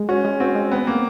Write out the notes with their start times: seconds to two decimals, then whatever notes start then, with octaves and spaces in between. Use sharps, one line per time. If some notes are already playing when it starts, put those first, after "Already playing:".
Already playing: G#3
0.09 C#4 F#4
0.25 G#3
0.40 C4 F#4
0.55 G#3
0.72 B3 C4
0.87 A#3 C4